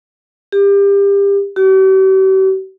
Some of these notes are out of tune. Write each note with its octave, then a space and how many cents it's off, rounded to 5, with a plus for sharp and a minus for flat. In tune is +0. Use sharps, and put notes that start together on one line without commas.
G4 +30
G4 -45